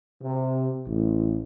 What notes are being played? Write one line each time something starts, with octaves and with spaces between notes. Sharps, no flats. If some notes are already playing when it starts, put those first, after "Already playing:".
C3
A1